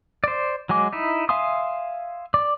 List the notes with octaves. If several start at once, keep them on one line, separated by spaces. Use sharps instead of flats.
C5 D5
F#3 G#3 G#5 D6
D#4 E4
E5 F5 G#5 C6 D#6
D5 D6